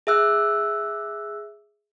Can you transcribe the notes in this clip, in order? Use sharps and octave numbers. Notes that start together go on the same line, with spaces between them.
G#4 E5 E6 F#6